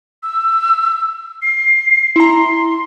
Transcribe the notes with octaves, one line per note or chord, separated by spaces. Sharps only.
E6
C7
E4 A#5 C6